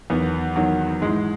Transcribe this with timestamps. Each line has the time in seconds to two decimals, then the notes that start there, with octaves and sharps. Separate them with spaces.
0.10 E2 D#3 F#3 B3
0.56 E2 D#3 F#3
1.02 G#2 E3 G#3